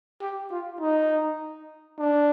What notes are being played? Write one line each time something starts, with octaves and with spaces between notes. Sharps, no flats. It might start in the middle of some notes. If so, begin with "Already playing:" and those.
G4
F4
D#4
D4